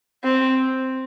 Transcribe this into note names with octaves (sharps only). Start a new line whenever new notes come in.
C4